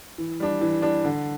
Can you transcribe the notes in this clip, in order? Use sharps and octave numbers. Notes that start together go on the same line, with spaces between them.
E3
G3 D4
E3
G3 D4
D3